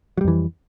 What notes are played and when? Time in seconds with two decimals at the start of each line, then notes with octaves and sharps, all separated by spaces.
0.17 F#3
0.21 G3
0.24 F2
0.28 E3